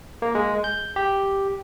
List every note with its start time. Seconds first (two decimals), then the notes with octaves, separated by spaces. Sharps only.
0.22 A#3
0.35 G#3
0.64 G6
0.96 G4